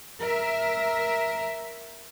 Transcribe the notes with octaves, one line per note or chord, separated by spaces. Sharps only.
A#4 E5